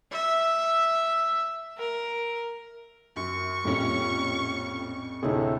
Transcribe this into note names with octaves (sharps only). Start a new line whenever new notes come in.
E5
A#4
F#2 C#6
A#1 F2 A2 G3 C#4
D2 A2 C3 D#4 G#4